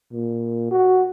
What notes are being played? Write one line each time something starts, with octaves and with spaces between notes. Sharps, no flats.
A#2
F#4